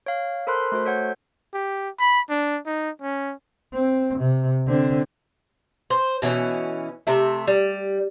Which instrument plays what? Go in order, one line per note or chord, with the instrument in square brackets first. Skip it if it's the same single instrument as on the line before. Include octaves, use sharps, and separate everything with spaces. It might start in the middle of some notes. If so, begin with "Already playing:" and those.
[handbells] C#5 F5
A4 A#4 C5 B5 C6 F#6
A3 F#4 C5
A4 C#5 F#5 G6
[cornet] G4
B5
D4
D#4
C#4
[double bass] C4
C3
D3 C4
[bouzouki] C5
B2 E3 C#4
C3 A3 E5
G3